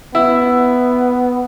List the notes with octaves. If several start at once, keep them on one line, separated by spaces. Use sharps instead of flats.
B3 E4